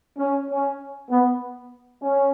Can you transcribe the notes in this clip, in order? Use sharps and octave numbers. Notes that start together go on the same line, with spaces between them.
C#4
C#4
B3
C#4